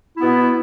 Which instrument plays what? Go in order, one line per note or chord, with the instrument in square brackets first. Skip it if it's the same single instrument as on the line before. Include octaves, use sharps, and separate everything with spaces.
[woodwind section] B2 B3 E4